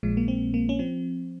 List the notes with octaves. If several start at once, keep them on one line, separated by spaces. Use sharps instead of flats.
A#1 A#2 F3 G#3
A#3
C4
A#3
C#4
F3 C4